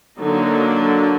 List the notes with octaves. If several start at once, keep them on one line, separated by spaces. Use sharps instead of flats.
D3 F#3 A#3 D4 D#4